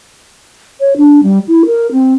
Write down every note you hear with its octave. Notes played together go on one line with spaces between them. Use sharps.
C#5
D4
G3
E4
A#4
C4